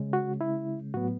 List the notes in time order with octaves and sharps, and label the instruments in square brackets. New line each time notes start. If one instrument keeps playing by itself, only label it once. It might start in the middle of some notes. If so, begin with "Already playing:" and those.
Already playing: [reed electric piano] C#3 G#3 C#4
F#4
E4
A2 F#3 B3 F#4